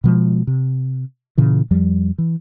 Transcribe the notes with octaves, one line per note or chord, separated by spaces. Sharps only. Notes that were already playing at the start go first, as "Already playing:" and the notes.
B2 F3 G#3
C3
A#2 C#3 E3
F2 F3 G3
E3